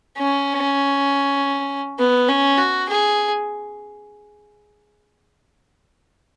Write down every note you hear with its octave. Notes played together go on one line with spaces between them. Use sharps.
C#4
B3
C#4
F#4
G#4